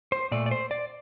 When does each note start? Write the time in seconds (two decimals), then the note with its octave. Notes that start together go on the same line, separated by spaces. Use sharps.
0.12 C5
0.31 A#2 A3 D5
0.46 D5
0.51 C5
0.71 D5